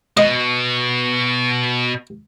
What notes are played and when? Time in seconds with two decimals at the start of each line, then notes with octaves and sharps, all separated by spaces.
0.17 B2 D#5